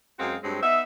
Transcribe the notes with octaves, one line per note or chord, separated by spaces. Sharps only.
F#2 G#3 C4 F#4 F5
G2 F#3 G#3 C4
B3 D#4 E5